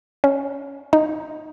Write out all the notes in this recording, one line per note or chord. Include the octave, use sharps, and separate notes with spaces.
C#4
D#4